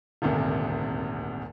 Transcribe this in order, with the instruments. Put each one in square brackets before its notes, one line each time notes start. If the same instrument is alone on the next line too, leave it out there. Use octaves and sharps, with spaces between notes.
[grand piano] D#1 G#1 D2 C3